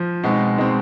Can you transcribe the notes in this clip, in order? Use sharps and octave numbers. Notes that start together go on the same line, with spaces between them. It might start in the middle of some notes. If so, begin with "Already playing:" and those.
Already playing: F3
B2 G#3 C4 D#4
B2 G#3 C4 D#4